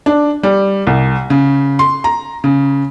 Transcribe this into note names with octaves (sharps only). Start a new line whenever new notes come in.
D4
G3
C2
C#3
C6
A#5
C#3